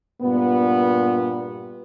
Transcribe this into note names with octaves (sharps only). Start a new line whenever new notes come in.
G2 A#2 B3